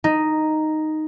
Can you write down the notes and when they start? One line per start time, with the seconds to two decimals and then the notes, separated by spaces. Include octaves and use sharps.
0.04 D#4